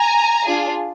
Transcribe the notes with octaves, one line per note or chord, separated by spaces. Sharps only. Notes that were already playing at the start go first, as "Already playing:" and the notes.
Already playing: G#5 A#5
D4 F4 G#4